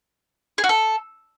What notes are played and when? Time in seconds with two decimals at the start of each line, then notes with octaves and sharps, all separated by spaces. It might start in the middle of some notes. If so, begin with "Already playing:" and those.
0.58 G#4
0.64 F#4
0.69 A4